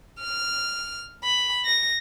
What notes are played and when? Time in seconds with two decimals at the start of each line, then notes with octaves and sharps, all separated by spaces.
0.20 F6
1.24 B5
1.65 A#6